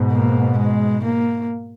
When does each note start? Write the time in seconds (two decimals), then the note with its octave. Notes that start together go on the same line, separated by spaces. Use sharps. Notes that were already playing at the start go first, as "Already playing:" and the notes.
Already playing: G#2 B2
0.11 A#3
0.58 G#3
1.04 A#3